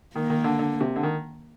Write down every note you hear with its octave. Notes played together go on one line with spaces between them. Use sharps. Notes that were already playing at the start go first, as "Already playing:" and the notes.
D#3 A#3
D#3
D3
D3
C3
D3
D#3